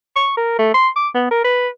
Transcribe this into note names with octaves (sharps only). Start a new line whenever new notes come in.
C#6
A#4
A3
C6
D6
B3
A#4
B4